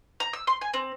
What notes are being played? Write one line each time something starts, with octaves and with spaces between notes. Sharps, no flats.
A#5
E6
C6
G#5
C4